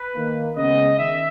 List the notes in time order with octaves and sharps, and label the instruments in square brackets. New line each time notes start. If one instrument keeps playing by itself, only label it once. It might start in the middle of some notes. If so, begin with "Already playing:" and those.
Already playing: [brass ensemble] B4
D#3 A#3
C#3 G#3 B3 D#5
D#3 E5